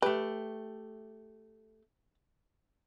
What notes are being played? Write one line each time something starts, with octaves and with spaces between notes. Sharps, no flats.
A3 G4 B4